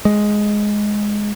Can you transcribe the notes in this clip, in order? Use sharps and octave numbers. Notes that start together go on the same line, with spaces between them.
G#3